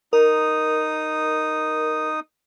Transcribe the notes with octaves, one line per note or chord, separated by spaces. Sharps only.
D#4 A#4 D#6